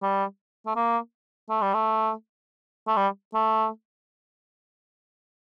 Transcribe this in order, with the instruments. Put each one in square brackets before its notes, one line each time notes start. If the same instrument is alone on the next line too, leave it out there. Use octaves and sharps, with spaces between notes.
[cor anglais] G3
A3
A#3
A3
G3
A3
A3
G3
A3